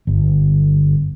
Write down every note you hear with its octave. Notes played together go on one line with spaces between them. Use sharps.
G1